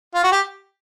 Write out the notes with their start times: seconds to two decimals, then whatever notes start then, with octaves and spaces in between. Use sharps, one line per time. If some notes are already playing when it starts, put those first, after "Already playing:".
0.15 F4
0.24 F#4
0.32 G4